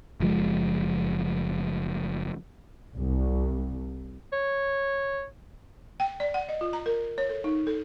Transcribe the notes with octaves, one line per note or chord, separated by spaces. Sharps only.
F#1 F3 G#3
C2
C#5
G5
D5
F#5
D#5
F4
A#5
A#4
C#5
A4
D#4
A4